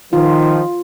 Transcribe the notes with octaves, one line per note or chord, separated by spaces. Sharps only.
D#3 F3 F4